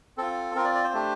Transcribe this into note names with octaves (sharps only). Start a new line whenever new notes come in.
C4 F4 A4
C4 F4 A#4
D5
D5
C5
A3 D4 G4